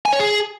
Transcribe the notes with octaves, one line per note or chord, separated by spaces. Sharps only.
G#5
C#5
G#4